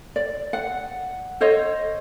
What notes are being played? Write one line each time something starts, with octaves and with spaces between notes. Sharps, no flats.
D5
F#5
A4 C5 C#5 D#5